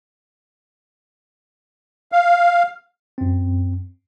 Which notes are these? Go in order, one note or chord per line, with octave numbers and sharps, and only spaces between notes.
F5
F#2 C4